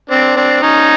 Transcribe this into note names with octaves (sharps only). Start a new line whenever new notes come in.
C4 D4
C4 D4
C#4 D#4